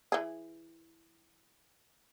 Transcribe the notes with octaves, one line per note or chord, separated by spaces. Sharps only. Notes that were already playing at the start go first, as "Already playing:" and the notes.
E3 G#4